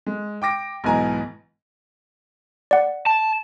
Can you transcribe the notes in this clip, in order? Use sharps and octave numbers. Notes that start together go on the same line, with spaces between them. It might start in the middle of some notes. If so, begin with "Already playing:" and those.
G#3
G5 D6 A#6 D7
B1 G#2 E3 G#5 A#5
D5 F#5
A5